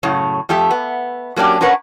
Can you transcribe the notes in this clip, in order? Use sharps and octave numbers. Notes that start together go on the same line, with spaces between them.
F#2 A2 C#3 C#5
F2 A3 G4 E5
B3
F#3 A#3 C#4 D4 G4
C#4 A#4 B4 C#5 F#5